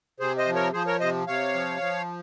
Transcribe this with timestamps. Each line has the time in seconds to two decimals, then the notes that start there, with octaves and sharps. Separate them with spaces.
0.20 C3 G#4 C5
0.38 C5 D#5
0.47 F3
0.55 A#4 C#5
0.74 F3 G#4 C5
0.87 A#4 C#5
1.00 C3 C5 D#5
1.27 C3 C#5 F5
1.54 F3
1.81 F3